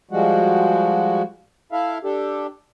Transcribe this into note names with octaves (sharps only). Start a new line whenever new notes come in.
F3 G3 G#3 F#4
E4 A4 E5 F5
D4 G4 A4